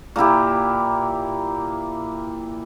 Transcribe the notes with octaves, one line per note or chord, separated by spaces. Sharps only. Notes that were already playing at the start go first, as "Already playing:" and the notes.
A#2 A#3 E4 G4